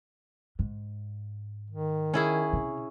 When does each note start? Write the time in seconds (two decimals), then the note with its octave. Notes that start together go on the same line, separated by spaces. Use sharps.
0.59 G#2
1.70 D#3
2.14 C#4 E4 G#4
2.53 C3